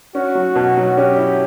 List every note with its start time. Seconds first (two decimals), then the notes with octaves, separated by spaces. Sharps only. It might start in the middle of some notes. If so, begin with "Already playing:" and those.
0.15 C#4 F#4
0.35 F#3
0.55 B2
0.77 F#3
0.97 C#4 G4
1.17 E4